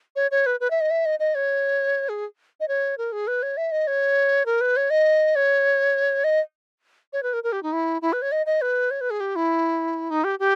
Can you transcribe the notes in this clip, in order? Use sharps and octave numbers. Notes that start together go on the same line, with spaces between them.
C#5
C#5
B4
B4
E5
D#5
E5
D#5
D#5
C#5
G#4
D#5
C#5
A#4
G#4
B4
C#5
E5
D#5
C#5
A#4
B4
C#5
D#5
C#5
D#5
C#5
B4
A#4
A#4
G4
D#4
E4
E4
B4
C#5
D#5
D#5
B4
C#5
B4
G#4
G4
E4
D#4
G4
G4